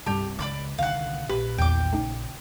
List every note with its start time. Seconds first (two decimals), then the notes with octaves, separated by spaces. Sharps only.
0.06 C2 G2 G3 G4 A5
0.39 C#2 D#4 D5 B5 D6
0.78 C2 D3 D#3 F5 F#5
1.29 A#1 G4 B4
1.58 E2 D#3 G5 D6
1.93 C#3 A3 D#4